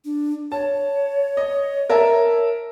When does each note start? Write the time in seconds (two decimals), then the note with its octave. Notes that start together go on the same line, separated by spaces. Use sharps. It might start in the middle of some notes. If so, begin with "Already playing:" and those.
0.05 D4
0.52 C#5 A5
1.37 D#5
1.90 A#4 E5 A5